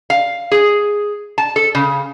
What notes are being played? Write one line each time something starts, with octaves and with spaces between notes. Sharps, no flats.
F5
G#4
A5
A4
C#3